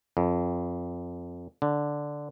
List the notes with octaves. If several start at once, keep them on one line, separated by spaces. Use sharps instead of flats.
F2
D3